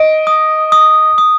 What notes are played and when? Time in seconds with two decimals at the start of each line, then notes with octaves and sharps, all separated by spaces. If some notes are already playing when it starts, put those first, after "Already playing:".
Already playing: D#5 D7
0.27 D#6
0.72 D#6
1.18 D#6